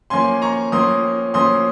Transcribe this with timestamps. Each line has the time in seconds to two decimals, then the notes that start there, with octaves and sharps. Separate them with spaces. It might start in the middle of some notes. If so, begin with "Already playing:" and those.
0.10 F3 A#3 C#4 G#5 C6
0.42 A#5 C#6
0.72 F3 A#3 C#4 C6 D#6
1.34 F3 A#3 C#4 C6 D#6